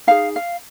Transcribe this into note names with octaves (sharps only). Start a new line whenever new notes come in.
D#4 G#4 F5
F5